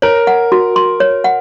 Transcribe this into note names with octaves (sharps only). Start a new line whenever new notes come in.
A#4 C#5
F#5
F#4
C6
C#5
F#5